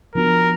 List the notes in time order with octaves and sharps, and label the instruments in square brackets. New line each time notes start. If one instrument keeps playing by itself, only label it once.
[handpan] F3 B3 D4 F#4 [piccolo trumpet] A#4